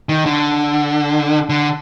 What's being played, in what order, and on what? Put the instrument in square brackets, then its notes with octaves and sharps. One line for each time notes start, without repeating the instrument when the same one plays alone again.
[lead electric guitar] D#3
D3
D3